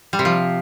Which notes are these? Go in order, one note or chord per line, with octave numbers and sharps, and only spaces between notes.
G3
C3
F3